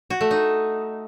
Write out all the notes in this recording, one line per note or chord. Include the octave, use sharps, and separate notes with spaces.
F#4
A3
D#4